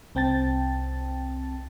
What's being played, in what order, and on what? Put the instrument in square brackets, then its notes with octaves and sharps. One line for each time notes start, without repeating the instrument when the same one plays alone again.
[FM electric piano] C2 C4 G5 A5 A6